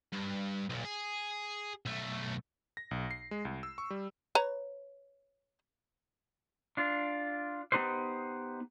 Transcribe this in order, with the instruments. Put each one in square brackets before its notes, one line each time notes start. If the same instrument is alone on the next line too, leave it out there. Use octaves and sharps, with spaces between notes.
[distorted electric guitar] G2
B1 A#2
G#4
B1 A3
[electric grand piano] A#6
B1
C7
G#3
C2
E6
C#6
G3
[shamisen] B4 C#5 A#5
[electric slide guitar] D4 F4
B3 D#4 G4 B4 C5